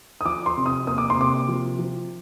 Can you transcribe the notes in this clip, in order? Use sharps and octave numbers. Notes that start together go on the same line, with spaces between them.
D#6
F3 D6
C6
C3
D#6
A#3 D#6
D6
C6
C3 D6
F3
F3